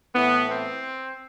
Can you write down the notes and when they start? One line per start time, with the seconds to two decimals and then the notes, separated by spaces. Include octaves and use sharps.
0.15 A2 E3 B3
0.50 C4